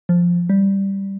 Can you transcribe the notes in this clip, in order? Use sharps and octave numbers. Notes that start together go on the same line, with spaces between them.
F3
G3